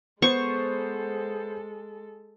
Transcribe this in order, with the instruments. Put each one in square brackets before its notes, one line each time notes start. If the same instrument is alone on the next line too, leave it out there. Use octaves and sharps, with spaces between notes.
[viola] G#3 A4 [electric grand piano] B3 C5 [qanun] C#6